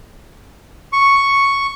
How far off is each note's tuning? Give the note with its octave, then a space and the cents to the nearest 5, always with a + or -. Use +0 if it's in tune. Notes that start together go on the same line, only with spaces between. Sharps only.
C#6 +0